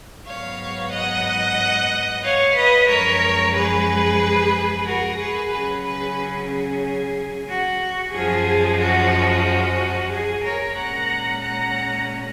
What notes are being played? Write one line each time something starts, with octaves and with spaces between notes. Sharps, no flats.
G#2 F#3 B3 C#5 F5
D#5 F#5
C#5 F5
B4 D#5
F#2 F3 G#3 A#4 C#5
G#4 B4
F#4 A#4
G#4 B4
C#3 F#3 C#4 G#4 B4
G#4 B4
G#4
F#4
F#2 F3 G#3 G#4
F#4
F#4
G#4
A#4 C#5
A#2 G#3 C#4 F#5 A#5
F#5 A#5